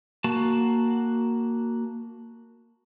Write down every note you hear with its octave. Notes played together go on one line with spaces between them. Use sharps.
A#3 F#4 A5